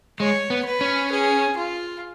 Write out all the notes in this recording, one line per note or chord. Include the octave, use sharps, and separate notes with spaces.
G#3 C#5
B3
B4
C#4
G#4
F4